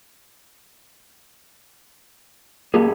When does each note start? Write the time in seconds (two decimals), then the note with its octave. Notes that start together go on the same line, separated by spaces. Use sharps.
2.74 F#2 A#3 G4 G#4